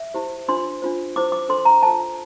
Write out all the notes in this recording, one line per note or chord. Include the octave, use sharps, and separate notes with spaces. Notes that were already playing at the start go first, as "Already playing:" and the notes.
Already playing: E5
E4 G4 C5
D4 F4 C5 C6
D4 F4 C5
E4 G4 C5 D6
D6
D4 A4 C5 C6
A#5
F4 A4 C5 A5